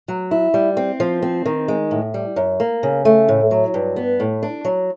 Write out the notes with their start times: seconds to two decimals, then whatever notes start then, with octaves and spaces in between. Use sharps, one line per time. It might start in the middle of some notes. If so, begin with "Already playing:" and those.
0.08 F#3
0.31 E4
0.54 G3
0.77 C4
1.00 F3
1.22 C4
1.46 D#3
1.68 G#3
1.91 A2
2.14 G3
2.36 F#2
2.60 A#3
2.83 C#3
3.05 A3
3.29 A2
3.51 F#3
3.74 G2
3.96 B3
4.20 A2
4.43 D4
4.65 F#3